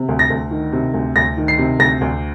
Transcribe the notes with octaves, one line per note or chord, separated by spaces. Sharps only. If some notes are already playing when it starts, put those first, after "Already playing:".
Already playing: C3
D2
A#6
D2
D#3
C3
D2
D2 A#6
D#3
C7
C3
D2 A#6
D2